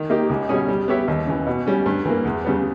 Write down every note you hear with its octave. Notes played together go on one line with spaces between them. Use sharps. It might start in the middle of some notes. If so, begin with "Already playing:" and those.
Already playing: D#3
A#3 D#4 G4
C#2
B2 G3 C#4 G#4
G3
B3 G4 C#5 E5
D#2
C#3 E3
B2
G3 C#4
G2
E3 A#3
E2
C#3 G3 B3